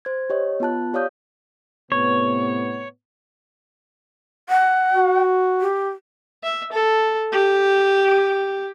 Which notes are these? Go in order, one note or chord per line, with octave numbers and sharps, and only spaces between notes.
C5 G#6
G4 C#5 D#5
B3 F4 A5 F#6
G4 C#5 D5 F5 D#6 G6
A2 C3 B3 C#5
F#5
F#4
G4
E5
A4
G4